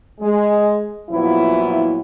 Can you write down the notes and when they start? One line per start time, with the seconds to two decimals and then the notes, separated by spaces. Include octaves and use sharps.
0.21 G#3
1.11 A#2 F3 F#3 B3 E4